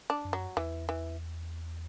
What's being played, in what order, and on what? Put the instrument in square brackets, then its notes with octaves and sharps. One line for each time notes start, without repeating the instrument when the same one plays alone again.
[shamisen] D4
[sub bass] F#2
[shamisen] F#3
[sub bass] E2 [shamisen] E3
[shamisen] E3